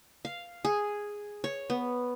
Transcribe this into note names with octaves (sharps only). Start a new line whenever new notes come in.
F5
G#4
C#5
B3